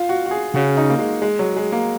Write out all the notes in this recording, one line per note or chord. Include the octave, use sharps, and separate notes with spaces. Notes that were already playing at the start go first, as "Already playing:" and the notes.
Already playing: F4
F#4
F#4
G#4
C#3 F#4
D#4
A#3
G#3
G#3
F#3
G#3
A#3